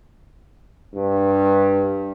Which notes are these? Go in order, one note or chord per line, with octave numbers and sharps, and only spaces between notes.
G2